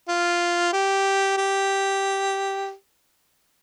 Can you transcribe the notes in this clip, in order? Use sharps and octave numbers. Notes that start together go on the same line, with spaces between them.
F4
G4
G4